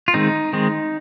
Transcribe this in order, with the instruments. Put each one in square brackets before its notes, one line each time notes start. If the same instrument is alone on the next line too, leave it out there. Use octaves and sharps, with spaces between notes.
[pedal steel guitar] F4
D#3 G#3 C4 D#4
D#3 G#3 C4